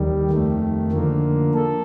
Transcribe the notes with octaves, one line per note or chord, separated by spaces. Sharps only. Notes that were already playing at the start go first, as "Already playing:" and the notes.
Already playing: D#2 D#3 G3
F2 D#3 A3
D3 F3 A#3
A4